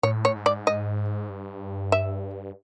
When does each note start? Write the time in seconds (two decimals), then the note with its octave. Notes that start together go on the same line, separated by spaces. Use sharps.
0.03 A2 C#5
0.25 C#5
0.36 G#2
0.46 D5
0.67 D#5
1.29 G2
1.92 E5